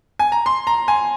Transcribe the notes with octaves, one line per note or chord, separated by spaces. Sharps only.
G#5
A#5
C6
A#5
G#5